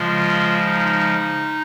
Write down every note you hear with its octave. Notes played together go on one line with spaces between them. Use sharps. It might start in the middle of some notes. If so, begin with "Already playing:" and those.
Already playing: C#3 F3 G#3 F4
D#4